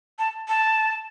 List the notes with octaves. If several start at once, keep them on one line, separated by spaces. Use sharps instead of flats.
A5
A5